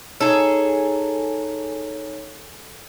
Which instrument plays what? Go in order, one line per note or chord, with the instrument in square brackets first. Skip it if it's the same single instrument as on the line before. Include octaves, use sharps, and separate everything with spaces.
[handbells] D#4 C#5 [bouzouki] G#4 A4